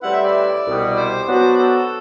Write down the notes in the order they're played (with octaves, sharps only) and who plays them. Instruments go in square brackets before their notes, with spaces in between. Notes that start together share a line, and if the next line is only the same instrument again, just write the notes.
[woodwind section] A2 G3 C4 E4 B4 [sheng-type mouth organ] F#5
[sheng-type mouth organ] E5
D5
[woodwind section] C2 B2 G3
[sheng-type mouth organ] C5
[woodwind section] F#3 B3 D4 F#4
[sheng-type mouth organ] A4